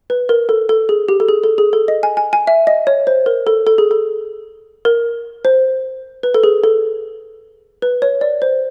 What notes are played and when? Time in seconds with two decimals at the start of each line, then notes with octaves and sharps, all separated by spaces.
0.10 B4
0.29 A#4
0.49 A4
0.69 A4
0.89 G#4
1.09 G4
1.20 A4
1.29 G#4
1.43 A4
1.58 G#4
1.73 A4
1.88 D#5
2.03 G#5
2.17 G#5
2.33 G#5
2.47 E5
2.67 D#5
2.87 C#5
3.07 C5
3.26 A#4
3.47 A4
3.67 A4
3.78 G#4
3.91 A4
4.85 A#4
5.45 C5
6.23 B4
6.34 A4
6.44 G#4
6.64 A4
7.82 B4
8.02 C#5
8.21 D5
8.42 C5